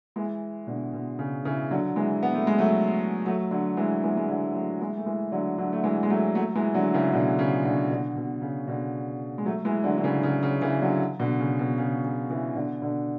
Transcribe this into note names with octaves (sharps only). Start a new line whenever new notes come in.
E3 G#3
B2 D3
B2
C#3
C#3 E3
D3 F#3
E3 G#3
B3
A3
G#3
F#3 A3
F#3 A3
D3 F#3
E3 G#3
E3 G#3
G#3
D3 F#3
F#3 A3
E3 G#3
A3
E3 G#3
D3 F#3
D3 F#3
A3
E3 G#3
G#3
F#3 A3
F#3 A3
E3 G#3
D3 F#3
C#3 E3
B2 D3
C#3
B2 D3
B2 D3
B2
C#3
B2 D3
G#3
F#3 A3
E3 G#3
D3 F#3
D3
C#3 E3
C#3
C#3
C#3 E3
D3 F#3
B2 D3
C#3
B2
C#3
C#3
C#3 E3
B2 D3
B2 D3